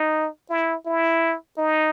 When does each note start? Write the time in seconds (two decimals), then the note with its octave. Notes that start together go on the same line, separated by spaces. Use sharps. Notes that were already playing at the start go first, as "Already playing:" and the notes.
Already playing: D#4
0.50 E4
0.86 E4
1.58 D#4